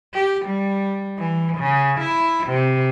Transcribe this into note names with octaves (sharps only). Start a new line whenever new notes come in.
G4
G3
E3
C#3
E4
C3